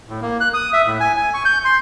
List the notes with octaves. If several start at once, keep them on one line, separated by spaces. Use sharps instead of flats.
A2
A#3
F#6
D#6
E5
A2
G#5
G#5
C#6
G6
C6